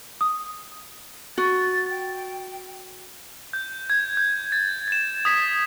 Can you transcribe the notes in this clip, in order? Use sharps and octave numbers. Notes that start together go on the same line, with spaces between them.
D#6
F#4 A6
G5
G6
G#6
G6
A6
A6 E7
D#6 G#6 B6